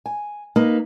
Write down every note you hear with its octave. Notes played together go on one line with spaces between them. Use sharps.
G#5
A#3 D#4 B4